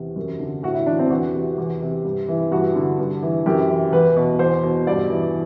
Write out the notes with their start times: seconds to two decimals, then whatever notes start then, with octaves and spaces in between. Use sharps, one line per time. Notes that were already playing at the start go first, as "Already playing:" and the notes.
Already playing: E2 C3
0.16 F#2
0.39 D3
0.63 A2 F#4
0.75 E4
0.86 E3 D4
0.99 C4
1.10 E2 F#4
1.34 C3
1.58 E2
1.82 C3
2.04 G2
2.29 E3
2.51 G2 F#4
2.76 D3
2.99 G2
3.22 E3
3.46 F#2 G4
3.69 E3
3.92 E2 B4
4.17 B2
4.39 E2 C5
4.63 B2
4.87 G2 D5
5.10 E3